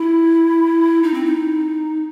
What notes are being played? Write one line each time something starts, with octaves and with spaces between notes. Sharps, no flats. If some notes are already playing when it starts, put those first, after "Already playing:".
Already playing: E4
D#4
C4
D#4